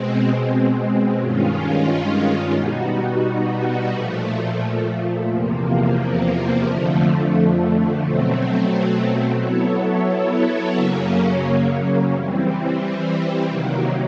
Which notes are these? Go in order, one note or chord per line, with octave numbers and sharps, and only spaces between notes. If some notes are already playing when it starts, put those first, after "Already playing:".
Already playing: B2 G#3 C4
G2 D#3 G#3 C#4 F4
B2 G3 B3 D#4 F#4
A#2 F3 A3
E2 C3 F3 A#3
F2 D3 F3 A3
B2 F#3 A3 C4
F#3 B3 E4 A4 C#5
F#2 C#3 F#3 A#3 C#4
E3 G3 C4
C3 D#3 F#3 A#3